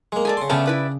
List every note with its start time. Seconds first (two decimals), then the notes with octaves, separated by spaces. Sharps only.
0.12 G#3 A#3
0.25 G#4 A4 D5
0.37 C#3 C6
0.50 C#3 A3 B3 C#4 D4 G5 A5 D6
0.66 E4 B4 D5